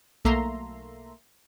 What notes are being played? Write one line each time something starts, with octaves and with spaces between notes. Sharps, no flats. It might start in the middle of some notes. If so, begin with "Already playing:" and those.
B1 A3 A#3 E5 A#5 C6